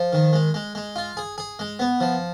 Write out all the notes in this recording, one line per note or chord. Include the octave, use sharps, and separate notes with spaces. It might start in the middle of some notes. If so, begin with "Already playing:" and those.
Already playing: F3
D#3
G#3
G#3
G#3
F4
G#4
G#4
G#3
B3
F3